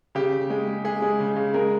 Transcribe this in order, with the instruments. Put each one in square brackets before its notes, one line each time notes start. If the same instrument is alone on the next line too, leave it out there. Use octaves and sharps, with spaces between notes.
[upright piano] C#3 G4
C#3
G#3
G#3
G#3 G#4
G#3
C#3
C#3
G#3 A#4